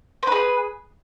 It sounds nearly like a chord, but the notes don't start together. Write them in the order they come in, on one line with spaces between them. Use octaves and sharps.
C5 B4 G#4